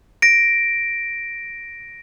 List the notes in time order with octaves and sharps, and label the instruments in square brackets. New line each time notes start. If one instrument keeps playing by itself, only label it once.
[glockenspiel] A#6 D7